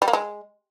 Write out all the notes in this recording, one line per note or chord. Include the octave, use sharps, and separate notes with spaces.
G3
A#3
G#3